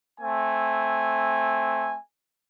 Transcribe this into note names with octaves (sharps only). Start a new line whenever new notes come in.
A3 C4 G#5